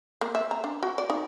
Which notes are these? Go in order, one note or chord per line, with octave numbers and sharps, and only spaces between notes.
A#3
E5
A#5
D4
F#4
D5
D#4